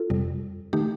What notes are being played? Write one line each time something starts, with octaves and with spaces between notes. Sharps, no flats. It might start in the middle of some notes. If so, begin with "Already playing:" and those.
Already playing: F4 A4
F2 C3 G3
D#3 A3 D#4 G4